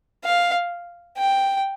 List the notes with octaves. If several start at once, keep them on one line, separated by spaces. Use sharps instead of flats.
F5
G5